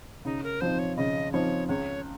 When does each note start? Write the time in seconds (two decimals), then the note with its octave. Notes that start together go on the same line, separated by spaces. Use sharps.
0.25 C#3 D#4
0.44 A#4
0.61 F3 C4 D#4 C5
0.79 C#5
0.97 C#3 D#5
1.32 F3 C4 D#4 C#5
1.68 C#2 C#5